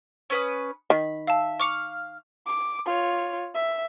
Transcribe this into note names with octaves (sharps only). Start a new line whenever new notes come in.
C#4 B4 D#6
D#3 B5
E5 F5 A5
F5 C#6 D6 C#7
D6
F4 C#5
E5